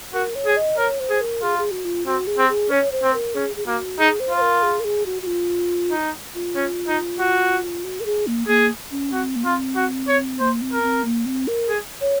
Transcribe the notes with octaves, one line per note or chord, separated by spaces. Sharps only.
F#4 A#4
C#5
G#4
D#5
A#4 C#5
C5
G#4
A#4
F4 G#4
G#4
F#4
F4
C4 F#4
G#4
C4
G#4
C#4 C#5
C5
C4
A#4
C#4 G#4
G#4
A#3 F#4
D#4 G#4
C5
F4
C5
A#4
G#4
A#4
G#4
F#4
F#4
F4
D#4
F4
C#4
D#4
F#4
F#4
A#4
G#4
A#3
A#3 G#4
C#4
C4 F#4
A#3
C4 F4
F#4
C#5
A#3 C5
C4
A#4
C4
A#3
C4
A#4
G#4
C#5